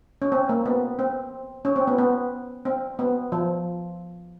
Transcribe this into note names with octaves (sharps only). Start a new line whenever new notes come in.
C#4
C4
A#3
B3
C4
C#4
C4
B3
B3
C4
B3
F3